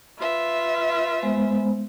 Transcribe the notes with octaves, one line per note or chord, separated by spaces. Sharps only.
F4 B4 E5
G#3 B3 C5